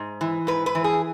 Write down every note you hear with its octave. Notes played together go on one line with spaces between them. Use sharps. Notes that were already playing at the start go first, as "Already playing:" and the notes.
Already playing: G#2
E3
G#2 B4
B4
E3
G#4